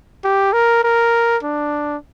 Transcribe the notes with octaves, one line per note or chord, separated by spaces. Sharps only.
G4
A#4
A#4
D4